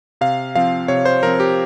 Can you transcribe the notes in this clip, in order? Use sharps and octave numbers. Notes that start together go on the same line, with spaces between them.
C3 F5
F3 C4 F5
C3 C#5
C5
F3 C4 A#4
G4